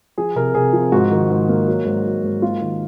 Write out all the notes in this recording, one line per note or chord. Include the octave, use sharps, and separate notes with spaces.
F3 G#4
C3 A#4
C3 G#4
F3
G#2 F#4
D#3
G#2
A#3
F#3
G#2
F#3
G#2
A#3 F4
D#3